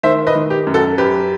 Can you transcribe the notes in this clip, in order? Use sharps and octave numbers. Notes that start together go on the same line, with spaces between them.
D#3 C5 E5
B4 D#5
D#3
G4
F#2
F#4 A4
F#2 G4 B4